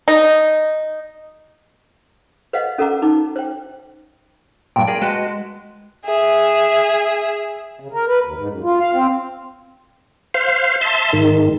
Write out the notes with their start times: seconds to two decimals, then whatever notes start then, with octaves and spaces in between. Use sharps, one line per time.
0.08 D#4
2.53 B4 C5 D#5 F5 F#5
2.78 C#4 A4 A#4 F#5 A#5 D6
3.02 D#4 D6
3.36 C5 G5
4.76 G2 A#2 G5
4.87 G#4 A#4 D5
5.02 G#3 F#4 B4 A5
6.06 G#4 E5
7.80 C#3
7.93 A#4
8.08 B4
8.25 D#2
8.36 G#2
8.49 F#2
8.63 F4
8.80 F5
8.93 C4
10.34 C5 F5
10.81 E5 A5 C6
11.13 G#2 D#3